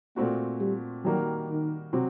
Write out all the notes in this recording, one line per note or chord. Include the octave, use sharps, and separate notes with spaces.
A#2 A3 A#3 C4 F#4
G3
D#3 F#3 G3 A#3 F#4 A#4
D#3
C3 F#3 C4 F#4